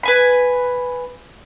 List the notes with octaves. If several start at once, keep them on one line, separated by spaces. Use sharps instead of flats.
B4 G#5 B5